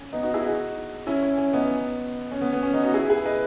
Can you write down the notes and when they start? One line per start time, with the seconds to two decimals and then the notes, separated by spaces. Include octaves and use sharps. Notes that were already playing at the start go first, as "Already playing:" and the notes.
Already playing: C#4
0.13 B3 D#4
0.23 D#4 F#4
0.34 E4 G#4
0.44 D#4 F#4
1.07 C#4 E4
1.22 C#4
1.38 C#4
1.53 B3 D#4
2.31 C#4
2.41 B3
2.52 B3
2.63 C#4
2.73 B3 D#4
2.84 D#4 F#4
2.94 E4 G#4
3.09 G#4 B4
3.26 B4 D#5